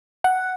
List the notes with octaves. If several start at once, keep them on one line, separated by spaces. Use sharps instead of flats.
F#5